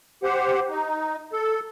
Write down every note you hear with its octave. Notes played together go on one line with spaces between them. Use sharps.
G4 C5 F#5
D#4
A4